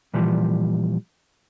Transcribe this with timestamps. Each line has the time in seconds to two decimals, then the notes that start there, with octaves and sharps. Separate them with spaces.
0.14 A#2 E3 F3 G3